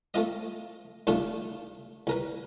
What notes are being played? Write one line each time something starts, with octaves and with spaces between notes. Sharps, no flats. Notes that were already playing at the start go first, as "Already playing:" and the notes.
A3 C4 F4 D#5
D#2 C3 G3 A3 D4 F4
C2 A#4 B4